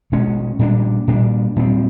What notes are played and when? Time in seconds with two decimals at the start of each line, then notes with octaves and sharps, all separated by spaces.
0.12 B2 G#3 C#4
0.59 A#2 G3 A#3 D4
1.08 A#2 G3 A#3 D4
1.56 A#2 G3 C4